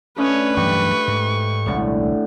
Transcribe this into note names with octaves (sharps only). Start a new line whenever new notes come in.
A3 C#4 D4 B4 C#5 D#5
G2 E3 F#3 G4 C#6
G#2
D#1 C2 A2 D3 G#3